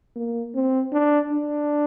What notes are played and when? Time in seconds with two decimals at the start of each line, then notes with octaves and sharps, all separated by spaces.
0.16 A#3
0.55 C4
0.93 D4
1.32 D4